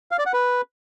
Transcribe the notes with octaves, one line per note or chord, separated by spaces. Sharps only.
F5
D5
F#5
B4